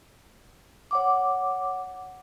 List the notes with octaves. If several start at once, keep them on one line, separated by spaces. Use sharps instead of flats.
C#5 F#5 D6